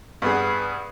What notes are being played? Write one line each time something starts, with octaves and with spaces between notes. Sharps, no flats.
G2 B3 G#4